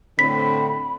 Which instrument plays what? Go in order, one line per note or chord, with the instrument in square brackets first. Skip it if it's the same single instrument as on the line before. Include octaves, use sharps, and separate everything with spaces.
[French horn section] A2 D3 C4 [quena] B5 [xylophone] B6